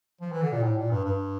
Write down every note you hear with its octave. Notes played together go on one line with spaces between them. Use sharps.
F3
E3
D3
A#2
A2
A#2
G2
G2